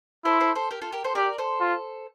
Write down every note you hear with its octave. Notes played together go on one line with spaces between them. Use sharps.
E4 A4 C5
A4 C5
A4 C5
G4 A#4
F4 A4
G4 A#4
A4 C5
G4 A#4 D5
A4 C5
F4